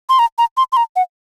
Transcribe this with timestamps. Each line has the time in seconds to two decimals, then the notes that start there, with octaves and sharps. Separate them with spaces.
0.09 C6
0.19 A#5
0.38 A#5
0.57 C6
0.72 C6
0.77 A#5
0.96 F#5